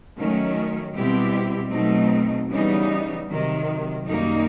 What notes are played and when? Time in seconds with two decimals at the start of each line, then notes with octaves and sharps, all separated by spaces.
0.16 D#3 F#3 A3 C#4
0.94 B2 G3 C4 E4 G4
1.71 B2 F#3 A3 C4 D#4
2.49 C#3 E3 G3 B3 D#4
3.27 C3 D#3 F#3
4.05 F#2 D#3 G3 A#3 D#4